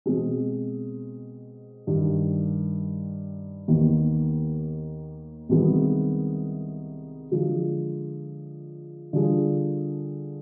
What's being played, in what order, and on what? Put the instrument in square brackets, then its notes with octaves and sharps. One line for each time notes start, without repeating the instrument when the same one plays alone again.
[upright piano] B2 G#3 C4
G2 D#3 G3
D#2 D#3 B3
C2 C3 D#3 G#3 B3
D3 F3 G#3
D3 G3 D4 F4 G#4